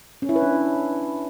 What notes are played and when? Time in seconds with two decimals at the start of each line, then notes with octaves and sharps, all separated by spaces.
0.22 C#4
0.29 E4
0.36 B4
0.42 D4